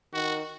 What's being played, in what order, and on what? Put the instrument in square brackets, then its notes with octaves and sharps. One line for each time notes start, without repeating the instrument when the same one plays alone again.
[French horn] D#3 [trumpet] F#4